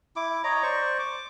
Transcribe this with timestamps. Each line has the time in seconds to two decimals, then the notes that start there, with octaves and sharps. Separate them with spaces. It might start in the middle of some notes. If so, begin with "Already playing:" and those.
0.16 E4 D6
0.44 C#5 D#5 A#5
0.63 C5 D5 C#6
0.99 D6